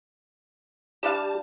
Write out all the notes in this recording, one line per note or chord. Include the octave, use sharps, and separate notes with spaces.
G3 D4 G4 F5 A5